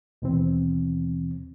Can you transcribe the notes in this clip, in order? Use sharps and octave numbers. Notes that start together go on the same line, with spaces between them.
D#2 B2 E3 C4